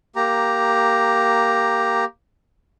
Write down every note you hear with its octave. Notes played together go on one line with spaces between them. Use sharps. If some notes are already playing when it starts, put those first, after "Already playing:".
A#3 G4 A#5